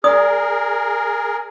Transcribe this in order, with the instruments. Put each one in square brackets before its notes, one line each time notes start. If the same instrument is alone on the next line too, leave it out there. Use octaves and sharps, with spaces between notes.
[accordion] G#4 A#4 [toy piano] D5 D#6